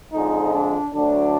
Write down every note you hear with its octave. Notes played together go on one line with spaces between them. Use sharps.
F2 D3 F3 G#3 D#4
D4
D2 D3 F#3 D4